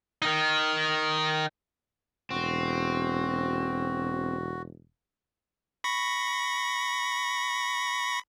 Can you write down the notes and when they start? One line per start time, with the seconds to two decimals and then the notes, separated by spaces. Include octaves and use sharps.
0.22 D#3 D#4
2.31 E1 C4 F#4
5.84 B5 C#6 A#6